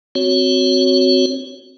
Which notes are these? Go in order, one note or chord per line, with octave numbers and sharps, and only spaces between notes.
C4 F#4 C#5